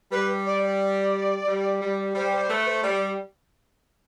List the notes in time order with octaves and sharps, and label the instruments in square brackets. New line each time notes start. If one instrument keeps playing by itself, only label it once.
[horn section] G3 [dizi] B4
[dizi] D5
D5
[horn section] G3
G3
[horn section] G3 [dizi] C5
[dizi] C5
[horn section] A3 [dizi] B4
[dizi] C5
[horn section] G3 [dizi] D5